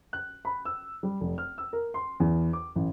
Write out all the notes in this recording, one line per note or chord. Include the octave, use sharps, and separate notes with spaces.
F#6
B5
E6
G3
F1
F6
E6
A#4
C6
E2
D6
A1